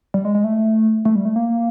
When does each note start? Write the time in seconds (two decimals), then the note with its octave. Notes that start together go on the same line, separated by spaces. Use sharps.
0.14 G3
0.25 G#3
0.35 G#3
0.44 A3
1.05 A3
1.15 G3
1.25 A3
1.36 A#3